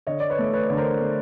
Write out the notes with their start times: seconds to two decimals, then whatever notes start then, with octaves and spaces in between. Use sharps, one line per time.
0.07 D3 C#5 D#5
0.20 D5
0.30 B4 C#5
0.39 A3
0.53 B4 C#5
0.70 D3
0.77 A#4 C5
1.01 A3